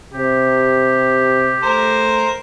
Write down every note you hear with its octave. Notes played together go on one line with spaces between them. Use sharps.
C3 G4
A3 A#4 C5